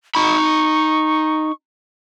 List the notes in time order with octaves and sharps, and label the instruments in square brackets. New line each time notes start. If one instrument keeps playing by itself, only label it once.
[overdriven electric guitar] D#4 B5 [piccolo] C#6